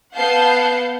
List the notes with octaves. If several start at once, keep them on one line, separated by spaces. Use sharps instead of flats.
B3 F5 F#5 A5 G6 C7